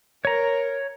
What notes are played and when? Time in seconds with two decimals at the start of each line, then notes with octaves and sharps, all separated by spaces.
0.25 A#4 C#5 A#5